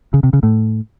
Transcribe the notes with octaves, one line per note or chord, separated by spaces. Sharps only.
C#3
C3
C#3
A2